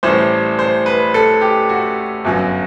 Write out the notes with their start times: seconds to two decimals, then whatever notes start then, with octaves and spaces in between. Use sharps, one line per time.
0.03 A1 A2 G3 C5
0.59 C5
0.86 B4
1.14 A4
1.41 G4
1.69 F#4
2.25 G1 F#2 F#3